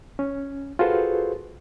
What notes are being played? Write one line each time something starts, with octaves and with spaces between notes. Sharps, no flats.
C#4
F4 F#4 G#4 A4 B4 C5